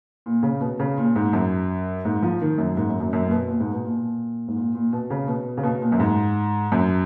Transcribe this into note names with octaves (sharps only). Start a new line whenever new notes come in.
A#2
C#3
B2
C#3
A#2
G#2
F#2
G#2
F3
D#3
F#2
G#2
F#2
F#2
F#2
A#2
B2
A#2
G#2
B2
A#2
G#2
A#2
A#2
B2
C#3
B2
C#3
B2
A#2
F#2
G#2
F#2